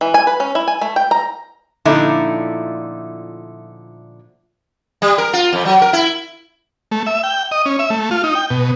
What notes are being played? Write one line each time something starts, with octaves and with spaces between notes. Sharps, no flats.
E3
G#5
B4
C#4
E4
G#5
A3
G5
A#5
A#2 D3 F3 A3 D#4 E4
G3
A#4
F4
F2
F#3
A#4
E4
A3
E5
G5
D#5
C#4
E5
A3
F4
D#4
G5
B2